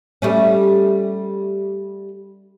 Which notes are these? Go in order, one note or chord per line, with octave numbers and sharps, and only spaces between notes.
G3 A3 C#4